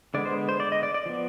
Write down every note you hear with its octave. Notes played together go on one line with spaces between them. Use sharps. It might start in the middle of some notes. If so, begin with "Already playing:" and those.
D3 G#3 B3 D5
C5
C5
D5
D#5
D5
D5
F3 B3